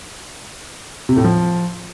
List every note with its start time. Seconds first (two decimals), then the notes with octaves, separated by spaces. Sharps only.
1.09 C3
1.17 A2
1.24 F3